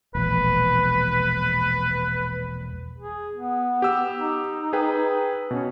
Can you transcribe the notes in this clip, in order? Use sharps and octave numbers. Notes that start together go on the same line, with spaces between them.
E1 A#1 B4
G#4
B3
G4 E6
D#4
G#4 B4 G5
B2 C#4